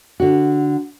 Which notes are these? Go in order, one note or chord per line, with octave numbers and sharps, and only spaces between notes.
D3 F#4